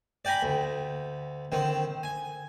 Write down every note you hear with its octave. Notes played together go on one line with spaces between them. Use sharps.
D5 G5 G#5 A#5 B5
D2
D3 D#3 C4
G#5